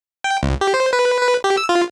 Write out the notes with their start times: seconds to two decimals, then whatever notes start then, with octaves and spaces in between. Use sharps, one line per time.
0.24 G5
0.43 C#2
0.61 G4
0.74 C5
0.93 B4
1.22 B4
1.44 G4
1.57 E6
1.69 F4